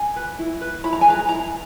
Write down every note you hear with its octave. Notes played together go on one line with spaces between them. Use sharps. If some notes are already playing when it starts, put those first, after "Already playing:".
Already playing: G#5
B4
E4
B4
E4 B5
A#5
G#5
G#4 B4 A#5
E4 A#5